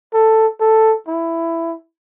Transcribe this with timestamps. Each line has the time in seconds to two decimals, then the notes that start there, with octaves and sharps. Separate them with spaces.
0.14 A4
0.61 A4
1.08 E4